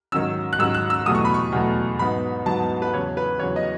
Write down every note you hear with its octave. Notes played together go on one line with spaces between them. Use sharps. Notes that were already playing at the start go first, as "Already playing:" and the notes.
G#2 D#3 F#3 C#4 E6
F#6
G#2 D#3 F#3 C#4 E6
F#6
E6
E2 B2 F#3 A3 D#6
C#6
B5
C#6
E2 B2 F#3 A3
G#2 F#3 B3 D#4 B5
G#2 F#3 B3 D#4 A5
B4
E2 C#3 F#3 C#5
B4
E2 C#3 F#3 C#5
D#5